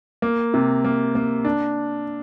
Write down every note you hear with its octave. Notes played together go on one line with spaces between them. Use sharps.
A#3
C3
A#3
A#3
D4